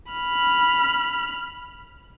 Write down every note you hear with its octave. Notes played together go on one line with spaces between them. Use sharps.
B5 F6